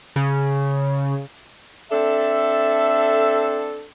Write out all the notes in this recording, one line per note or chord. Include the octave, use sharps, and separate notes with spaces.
C#3
C4 D4 A4 E5